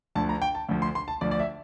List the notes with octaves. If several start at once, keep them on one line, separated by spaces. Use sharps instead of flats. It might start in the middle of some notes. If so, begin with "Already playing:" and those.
D2 D3 F3 A5
A#5
G5
A5
D2 D3 F3
C6
C6
A5
D2 D3 F3 D5
D5
E5